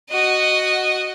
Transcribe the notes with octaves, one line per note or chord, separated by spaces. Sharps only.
F#4 D#5